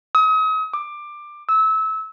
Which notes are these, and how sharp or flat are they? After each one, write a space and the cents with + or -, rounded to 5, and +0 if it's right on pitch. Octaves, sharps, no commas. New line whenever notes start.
D#6 +40
D6 +20
E6 -25